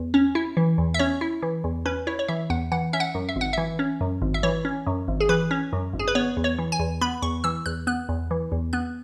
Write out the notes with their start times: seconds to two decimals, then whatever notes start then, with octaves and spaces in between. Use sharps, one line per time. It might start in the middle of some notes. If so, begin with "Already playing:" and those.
Already playing: E2
0.14 C#4
0.35 E4
0.57 E3
0.78 E2
0.94 E5
0.99 C#4 C#5
1.21 E4
1.43 E3
1.64 E2
1.86 C#4 B4
2.07 E4 C#5
2.19 C#5
2.28 E3 E5
2.50 E2 F#5
2.72 E3 F#5
2.93 C#4 E5
3.00 F#5
3.15 F#2
3.29 E5
3.36 G#1
3.41 F#5
3.53 E3 E5
3.79 C#4
4.01 F#2
4.22 G#1
4.34 E5
4.43 E3 C#5
4.65 C#4
4.87 F#2
5.08 G#1
5.20 G#4
5.29 E3 B4
5.51 C#4
5.73 F#2
5.93 G#1
5.99 G#4
6.08 B4
6.15 B3 C#5
6.37 E2
6.44 C#5
6.59 E3
6.72 G#5
6.79 E2
7.01 B3 B5
7.22 E2 C#6
7.44 E3 E6
7.66 E2 F#6
7.87 B3 F#6
8.09 E2
8.31 E3
8.52 E2
8.73 B3 F#6